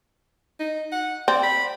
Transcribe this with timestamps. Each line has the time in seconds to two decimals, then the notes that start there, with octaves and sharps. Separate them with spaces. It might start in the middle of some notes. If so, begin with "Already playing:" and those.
0.59 D#4
0.92 F#5
1.28 C4 D5
1.43 B5